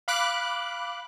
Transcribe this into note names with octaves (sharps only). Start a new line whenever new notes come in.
F5 B5 D6 F#6